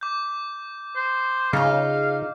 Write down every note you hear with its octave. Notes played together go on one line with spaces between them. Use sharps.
D6 G6
C5
C#3 D#4 F4 F5